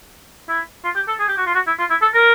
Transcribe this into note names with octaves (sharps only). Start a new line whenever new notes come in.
E4
F4
G4
A4
G#4
G4
F#4
F4
F#4
E4
F4
E4
A4
A#4